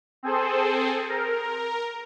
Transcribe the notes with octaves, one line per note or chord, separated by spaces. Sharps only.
C4 G#4 A4 C5
A#4